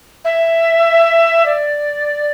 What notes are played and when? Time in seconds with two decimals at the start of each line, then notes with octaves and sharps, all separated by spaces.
0.25 E5
1.46 D5